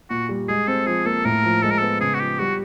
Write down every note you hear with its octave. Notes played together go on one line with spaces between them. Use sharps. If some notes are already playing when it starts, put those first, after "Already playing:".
A#2 F#4
G3
G#3 G#4
C4 A4
F3 G#4
A#3 A4
A2 A#4
F3
G#3 A4
A#4
B3 A4
C#3 G#4
F#4
F3 G4
G3 F#4